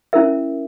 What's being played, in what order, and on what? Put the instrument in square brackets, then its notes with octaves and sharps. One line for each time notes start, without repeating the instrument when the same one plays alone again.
[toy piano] C#4 E4 A#4 E5